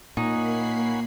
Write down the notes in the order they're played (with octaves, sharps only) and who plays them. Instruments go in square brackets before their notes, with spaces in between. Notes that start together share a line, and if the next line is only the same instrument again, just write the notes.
[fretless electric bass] A#2 [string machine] A#3 B5 C7 [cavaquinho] D#4 [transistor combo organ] C#5 F#5 G#5